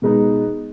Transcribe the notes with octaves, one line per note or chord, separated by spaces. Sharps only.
B2 G#3 B3 D#4